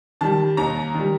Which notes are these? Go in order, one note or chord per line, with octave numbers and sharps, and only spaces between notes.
D#3 G3 A5
D#2 A#5
D#3 G3